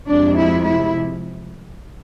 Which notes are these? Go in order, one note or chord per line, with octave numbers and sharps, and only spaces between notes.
F2 C3 G#3 D4
E4
E4